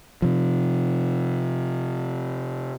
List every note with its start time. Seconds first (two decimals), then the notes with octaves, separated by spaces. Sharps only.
0.22 C3 F3